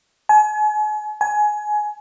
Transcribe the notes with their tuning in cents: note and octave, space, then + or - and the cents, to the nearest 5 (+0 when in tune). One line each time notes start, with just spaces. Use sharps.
G#5 +40
G#5 +20